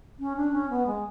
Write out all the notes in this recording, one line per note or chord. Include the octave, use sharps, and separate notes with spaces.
C#4
D4
C#4
B3
G#3